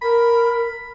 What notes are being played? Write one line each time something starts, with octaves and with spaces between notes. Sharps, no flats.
A#4 B5